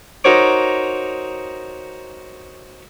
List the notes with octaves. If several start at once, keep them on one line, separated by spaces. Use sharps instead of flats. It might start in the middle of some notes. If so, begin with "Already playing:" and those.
D#4 F#4 A#4 C5 C#5 D6